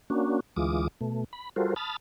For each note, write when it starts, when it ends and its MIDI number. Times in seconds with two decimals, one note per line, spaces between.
0.10 0.40 58
0.10 0.40 61
0.10 0.40 62
0.10 0.40 66
0.56 0.88 38
0.56 0.88 52
0.56 0.88 56
0.56 0.88 65
0.56 0.88 86
0.56 0.88 87
1.01 1.24 47
1.01 1.24 57
1.33 1.49 83
1.56 1.74 55
1.56 1.74 65
1.56 1.74 66
1.56 1.74 69
1.56 1.74 70
1.56 1.74 72
1.76 1.97 81
1.76 1.97 83
1.76 1.97 87
1.76 1.97 89
1.76 1.97 93